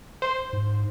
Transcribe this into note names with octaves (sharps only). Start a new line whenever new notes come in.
C5
G#2